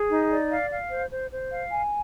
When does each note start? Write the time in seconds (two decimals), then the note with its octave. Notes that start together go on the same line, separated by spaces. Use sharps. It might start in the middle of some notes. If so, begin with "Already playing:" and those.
Already playing: G#4
0.10 D#4
0.30 D5
0.50 F5
0.71 F5
0.91 C5
1.11 C5
1.32 C5
1.52 F5
1.72 G#5